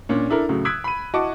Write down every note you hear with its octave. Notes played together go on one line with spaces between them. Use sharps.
A#2 C#4 D4
D4 E4 A4 A#4
A2 C#3 F#3
D#6 E6 F#6 G#6 B6 D7
B5 D#7
E4 F#4 D#5 A5 C#6 D6